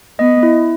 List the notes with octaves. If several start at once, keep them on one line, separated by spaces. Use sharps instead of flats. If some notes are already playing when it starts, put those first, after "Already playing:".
B3 D#5
E4